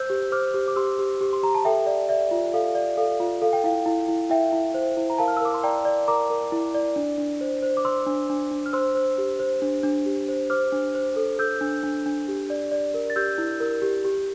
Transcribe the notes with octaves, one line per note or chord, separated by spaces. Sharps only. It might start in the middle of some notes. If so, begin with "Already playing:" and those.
Already playing: C5 E6 G6
G4
C5 D6 F6
G4
D6
G4 C6 E6
G4
G4
C6
G4 A#5
A5
A4 E5 G5
D5
D5 E5
F4
A4 F5
D5
A4 F5
F4
A4 F5
G5
E4 F5
E4
E4
E4 E5 G5
E4
C5
E4
A#5
A#4 F5 A5
F6
E6
A#4 D6
C6
D5 G5 A#5
D5
A#4 A#5 D6
A#4
E4
D5
D4
D4
C5
C5
D6
C5 C6 E6
D4
D4
D4
F6
C5 C6 E6
C5
G4
C5
D4
D4
G4
C5
C5 D6 F6
D4
C5
A4
A4 E6 G6
D4
D4
D4
G4
D5
D5
A#4
A6
G4 E6 G6
E4
A#4
G4
G4